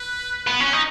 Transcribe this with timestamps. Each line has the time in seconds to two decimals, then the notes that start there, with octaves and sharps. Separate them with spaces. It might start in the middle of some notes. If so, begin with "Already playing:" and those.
Already playing: B4
0.47 B3
0.60 C#4
0.73 D#4